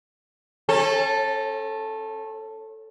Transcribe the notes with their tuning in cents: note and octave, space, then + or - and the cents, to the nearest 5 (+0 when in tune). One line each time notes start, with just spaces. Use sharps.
C#4 -35 A4 +0